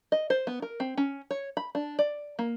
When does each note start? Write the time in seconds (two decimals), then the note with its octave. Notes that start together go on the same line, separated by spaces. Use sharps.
0.12 D#5
0.30 C5
0.47 B3
0.62 A#4
0.80 C4
0.97 C#4
1.31 C#5
1.57 B5
1.75 D4
1.99 D5
2.39 A#3